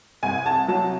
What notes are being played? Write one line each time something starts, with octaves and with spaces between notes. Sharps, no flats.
C2 G#5
A5
F#3 A5